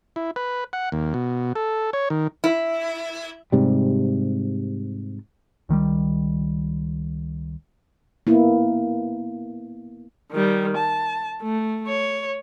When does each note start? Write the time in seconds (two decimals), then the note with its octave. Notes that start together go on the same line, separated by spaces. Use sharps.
0.16 E4
0.36 B4
0.73 F#5
0.92 D#2
1.14 B2
1.56 A4
1.93 C#5
2.10 D#3
2.44 E4
3.52 G#2 C3 G3
5.69 C#2 D#3 F#3 G3
8.27 A#3 B3 E4
10.32 D#3 G3
10.77 A5
11.42 A3
11.88 C#5